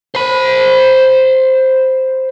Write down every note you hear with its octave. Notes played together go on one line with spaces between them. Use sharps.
C5 B5